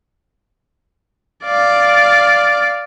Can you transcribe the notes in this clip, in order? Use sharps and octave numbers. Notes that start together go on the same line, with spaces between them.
D5 F5